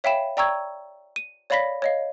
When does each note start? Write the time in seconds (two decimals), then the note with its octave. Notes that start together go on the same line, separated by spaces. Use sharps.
0.04 C#5 E5 F5 G5 B5 E7
0.37 D5 G5 A#5 C#6 E6 G#6
1.16 D#7
1.50 C#5 D5 F5 B5 A#6 B6
1.82 C#5 D#5 F5